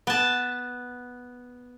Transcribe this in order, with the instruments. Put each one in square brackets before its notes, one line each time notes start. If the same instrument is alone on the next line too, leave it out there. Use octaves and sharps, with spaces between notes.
[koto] B3 A5